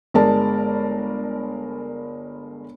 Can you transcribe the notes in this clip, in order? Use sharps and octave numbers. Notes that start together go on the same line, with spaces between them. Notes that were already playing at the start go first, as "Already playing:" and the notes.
G1 G#3 A#4 D5 A5